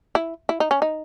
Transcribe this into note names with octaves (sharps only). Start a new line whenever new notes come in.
E4
E4
D#4
C#4
D#4